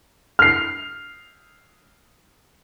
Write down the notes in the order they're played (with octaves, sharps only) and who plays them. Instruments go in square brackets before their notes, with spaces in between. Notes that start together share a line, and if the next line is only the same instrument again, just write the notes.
[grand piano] F6 C7